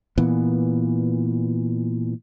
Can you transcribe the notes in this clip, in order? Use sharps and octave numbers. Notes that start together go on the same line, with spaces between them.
A#2 E3 B3